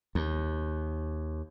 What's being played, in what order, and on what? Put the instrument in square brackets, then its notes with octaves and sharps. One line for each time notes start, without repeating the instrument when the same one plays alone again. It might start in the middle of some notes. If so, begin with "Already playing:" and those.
[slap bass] D#2